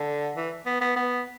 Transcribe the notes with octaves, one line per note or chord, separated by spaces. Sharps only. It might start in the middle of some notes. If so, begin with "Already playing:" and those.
Already playing: D3
E3
B3
B3
B3